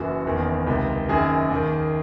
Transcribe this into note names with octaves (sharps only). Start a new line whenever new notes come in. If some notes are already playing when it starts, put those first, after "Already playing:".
Already playing: F#1 F#2 E3 F#4
F#1 E2 D#3
C#2 C3 D#3
F#1 F#2 D#3 G#4
D#2 D#3